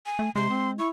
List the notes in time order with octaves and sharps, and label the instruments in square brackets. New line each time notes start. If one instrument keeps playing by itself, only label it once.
[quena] G#5
[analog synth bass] A3
[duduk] C3 [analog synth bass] G#3 [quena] C6
[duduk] C4
[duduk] E4 [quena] C#6